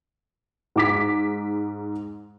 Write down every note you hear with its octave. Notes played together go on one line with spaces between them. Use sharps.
G#2 D6 B6